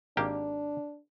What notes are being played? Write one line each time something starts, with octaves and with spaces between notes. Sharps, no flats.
G#1 A#3 D4 G4